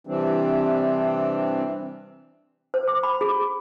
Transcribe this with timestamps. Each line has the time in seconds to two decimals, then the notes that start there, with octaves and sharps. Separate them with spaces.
0.07 C3 E3 G3 C4 D4
2.74 C5
2.88 D6
3.03 B5
3.21 G#4